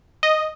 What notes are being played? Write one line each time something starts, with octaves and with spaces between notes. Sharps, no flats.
D#5